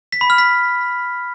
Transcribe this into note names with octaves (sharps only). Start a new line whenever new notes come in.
B6
B5
F6
B6